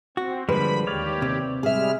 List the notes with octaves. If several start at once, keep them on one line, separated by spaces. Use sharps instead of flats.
C4 F#4
D3 F3 G3 G#3 A#3 B4 B5
D#2 G4 C#5 D5 F5
C3
G3 G#3 G#4 E5 F6